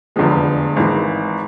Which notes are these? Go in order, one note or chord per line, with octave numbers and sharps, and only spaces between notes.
F1 E2 D3 F3 G#3
G#1 G#2 E3 G#3